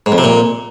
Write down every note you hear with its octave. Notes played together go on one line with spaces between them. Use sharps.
G#2
F2
C3
A#2